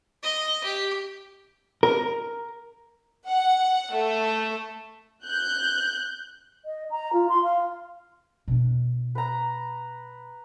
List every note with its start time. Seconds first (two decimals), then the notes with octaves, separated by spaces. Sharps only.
0.23 D#5
0.64 G4
1.83 A#4
3.28 F#5
3.94 A3
5.25 F#6 G6
6.65 D#5
6.91 A#5
7.13 F4
7.29 C6
7.43 F5
8.48 B2 D4
9.15 B4 A#5